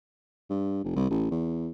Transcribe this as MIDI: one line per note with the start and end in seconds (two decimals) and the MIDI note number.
0.50 0.82 43
0.84 0.94 29
0.96 1.07 36
1.10 1.27 33
1.31 1.70 40